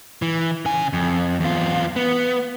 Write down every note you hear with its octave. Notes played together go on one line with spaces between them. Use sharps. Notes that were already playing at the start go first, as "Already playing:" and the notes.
E3
C#3 G#5
F2
E2 F4
B3